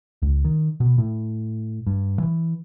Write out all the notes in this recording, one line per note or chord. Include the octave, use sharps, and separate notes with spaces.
C#2
D#3
B2
A2
G2
E3